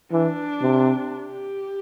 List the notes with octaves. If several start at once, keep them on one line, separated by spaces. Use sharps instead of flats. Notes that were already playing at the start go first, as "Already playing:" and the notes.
E3 D4
C3
G4